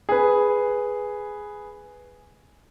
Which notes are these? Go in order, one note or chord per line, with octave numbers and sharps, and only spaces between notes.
G#4 B4